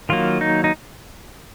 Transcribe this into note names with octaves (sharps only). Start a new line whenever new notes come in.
D#3 F#3 A#3 F4
D#4
D#4